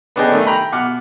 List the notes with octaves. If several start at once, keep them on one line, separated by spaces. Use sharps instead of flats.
B3 C#4 D4 G#4 D#5 G5
D#3 A3 D#4
G5 A#5 B5
B2 F#5 D6 F6